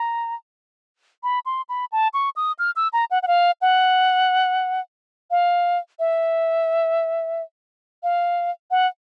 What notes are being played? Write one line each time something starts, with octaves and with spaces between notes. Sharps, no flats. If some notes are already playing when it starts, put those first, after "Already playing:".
Already playing: A#5
B5
C6
B5
A5
C#6
D#6
F6
E6
A#5
F#5
F#5
F5
F#5
F5
E5
F5
F#5